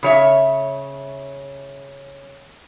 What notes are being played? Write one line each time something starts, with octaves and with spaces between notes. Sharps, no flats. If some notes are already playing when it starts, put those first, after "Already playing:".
C#3 C#5 E5